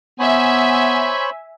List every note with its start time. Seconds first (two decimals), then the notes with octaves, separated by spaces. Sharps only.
0.19 B3 C5 C#5 E5 G#5 B5